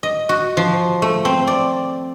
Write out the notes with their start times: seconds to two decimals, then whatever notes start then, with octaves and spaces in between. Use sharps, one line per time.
0.03 D#5
0.29 F#4
0.57 F3
1.02 A3
1.25 C4
1.47 D5